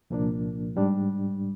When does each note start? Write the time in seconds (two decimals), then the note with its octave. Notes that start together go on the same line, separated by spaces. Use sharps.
0.10 C2 A#2 F3 A#3 D4
0.76 G#2 G3 D4